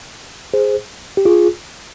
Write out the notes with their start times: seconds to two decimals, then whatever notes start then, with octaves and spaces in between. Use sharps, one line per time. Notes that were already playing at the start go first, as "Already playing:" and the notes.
0.54 G#4 C5
1.17 G4
1.25 F4 G#4